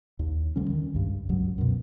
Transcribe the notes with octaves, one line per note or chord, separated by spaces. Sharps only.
D#2
D2 D3 G3 C#4
D#3
C#2 G2
C#2 G2 F#3
F#2 B2